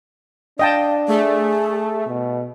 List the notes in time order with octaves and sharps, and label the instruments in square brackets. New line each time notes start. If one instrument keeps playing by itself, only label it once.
[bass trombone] D4 [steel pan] D#5 G5 A5 [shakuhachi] F5
[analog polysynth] A3 [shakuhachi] G#4
[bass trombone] B2